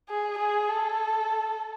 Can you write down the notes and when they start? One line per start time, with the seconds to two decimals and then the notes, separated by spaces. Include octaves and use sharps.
0.09 G#4
0.38 G#4
0.69 A4